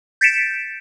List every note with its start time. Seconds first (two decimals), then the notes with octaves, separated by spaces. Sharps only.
0.21 G6 A6 B6 C#7 D7 E7